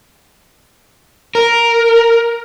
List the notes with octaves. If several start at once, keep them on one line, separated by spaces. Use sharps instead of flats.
A#4